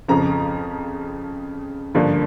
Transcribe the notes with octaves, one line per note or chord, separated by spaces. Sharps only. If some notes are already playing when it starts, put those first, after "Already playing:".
F2 C#3 F3 A#5
G2 D3 F3 A#3